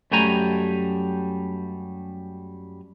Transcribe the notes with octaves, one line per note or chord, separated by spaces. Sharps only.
F#2 G3 A3 G4 G#5 A#5